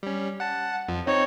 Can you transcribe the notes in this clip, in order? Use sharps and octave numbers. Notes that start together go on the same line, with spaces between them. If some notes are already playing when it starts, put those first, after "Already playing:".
G3 C#4
F#5 A5
F2 F3
C4 D#4 C#5